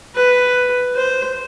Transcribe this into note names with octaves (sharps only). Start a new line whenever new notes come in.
B4
C5